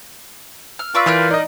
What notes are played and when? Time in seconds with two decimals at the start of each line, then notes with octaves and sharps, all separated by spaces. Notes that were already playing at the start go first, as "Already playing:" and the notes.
0.79 F6
0.95 F4 B4 D5 C#6 D6 E6
1.06 E3 A#4 F6 G6
1.31 D#4 D5 D#5